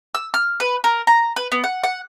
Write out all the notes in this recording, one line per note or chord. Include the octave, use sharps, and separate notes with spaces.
E6
F6
B4
A#4
A#5
B4
B3
F#5
F#5